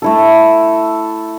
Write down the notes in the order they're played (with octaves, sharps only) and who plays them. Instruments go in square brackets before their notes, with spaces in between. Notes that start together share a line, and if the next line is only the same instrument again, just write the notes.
[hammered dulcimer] A3 E4 A4